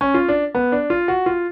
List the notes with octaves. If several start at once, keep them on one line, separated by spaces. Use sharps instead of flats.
C#4
F4
D4
B3
D4
F4
F#4
F4